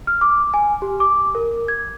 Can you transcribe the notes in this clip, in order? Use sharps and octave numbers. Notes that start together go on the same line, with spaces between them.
F6
D6
G#5
G4
D6
A#4
G#6